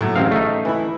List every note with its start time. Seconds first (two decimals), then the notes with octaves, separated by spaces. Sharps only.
0.01 A2 F#3
0.16 A1 C#3 C4 F5
0.31 A3 D#4
0.65 E3 E4